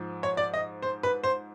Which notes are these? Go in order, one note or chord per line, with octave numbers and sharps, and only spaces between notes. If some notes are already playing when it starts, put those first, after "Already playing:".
Already playing: G#2 F3
C#5
D5
D#5
C5
B4
C5